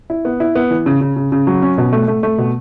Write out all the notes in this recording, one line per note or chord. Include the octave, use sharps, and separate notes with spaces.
E4
B3
E4
B3
E3
C#3
C#3
C#3
C#3
F#3
C#4
B2
A3
A3
A3
B2